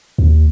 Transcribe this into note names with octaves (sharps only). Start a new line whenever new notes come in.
D#2